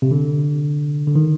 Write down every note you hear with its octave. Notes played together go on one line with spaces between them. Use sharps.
C3
D3
D3
D#3